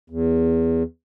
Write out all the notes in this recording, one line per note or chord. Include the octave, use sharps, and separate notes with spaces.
E2